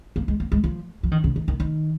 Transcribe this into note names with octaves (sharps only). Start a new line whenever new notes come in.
A#3
G#3
A#3
G#3
F3
F3
D#3
C#3
D#3
D#3
D#3